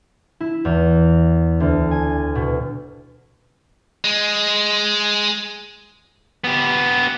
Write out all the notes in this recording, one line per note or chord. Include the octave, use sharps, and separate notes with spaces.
E4
E2
D2
G#5
B2
G#3
B3 G4